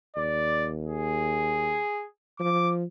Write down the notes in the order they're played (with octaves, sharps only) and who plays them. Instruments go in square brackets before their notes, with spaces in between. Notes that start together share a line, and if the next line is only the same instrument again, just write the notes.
[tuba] D#2 [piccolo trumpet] D5
[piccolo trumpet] G#4
[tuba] F3 [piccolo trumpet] D6